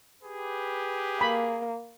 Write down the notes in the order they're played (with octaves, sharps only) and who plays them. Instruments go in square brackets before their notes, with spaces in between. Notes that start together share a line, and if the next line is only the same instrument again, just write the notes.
[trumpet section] G4 B4 [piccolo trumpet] G#4
[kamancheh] A#3 [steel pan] B5